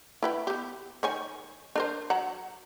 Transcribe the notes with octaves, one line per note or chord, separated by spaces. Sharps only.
E4 B4 G5
B3 G4
D#3 C#5 G#5
D4 A#4 C5
F#3 F#5 A#5